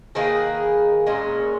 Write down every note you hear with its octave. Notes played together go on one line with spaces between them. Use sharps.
D#3 A#3 D#4 G#4 B4
A#2 G#3 C#4